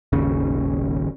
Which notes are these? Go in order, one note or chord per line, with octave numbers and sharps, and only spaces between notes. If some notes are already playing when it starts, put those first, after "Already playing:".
D#1 G#1 D#2 C#3